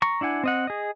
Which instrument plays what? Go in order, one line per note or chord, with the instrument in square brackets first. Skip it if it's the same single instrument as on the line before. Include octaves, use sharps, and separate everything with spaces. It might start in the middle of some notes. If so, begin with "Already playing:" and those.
[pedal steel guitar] A#5 C#6
D4 E4 F#5 G#5
C4 D#5 F#5
G#4 D#5